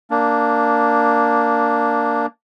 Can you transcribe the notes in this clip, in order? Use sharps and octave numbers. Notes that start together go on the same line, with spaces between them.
A#3 D4